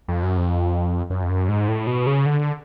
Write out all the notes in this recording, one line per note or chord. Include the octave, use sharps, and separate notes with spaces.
F2
F#2
F2
F#2
F2
F#2
G#2
A2
B2
C#3
D3